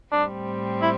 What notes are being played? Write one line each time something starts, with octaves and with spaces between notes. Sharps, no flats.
A2 G3 C4 D4
E4